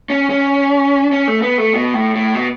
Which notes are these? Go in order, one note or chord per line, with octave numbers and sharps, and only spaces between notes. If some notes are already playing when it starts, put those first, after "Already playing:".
C#4
C#4
C#4
A3
B3
A3
B2
A2
A2
B2